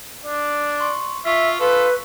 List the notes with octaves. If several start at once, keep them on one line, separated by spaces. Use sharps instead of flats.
D4 D5
C6 C#6
F4 E5 C#6 B6
F4 A4 B4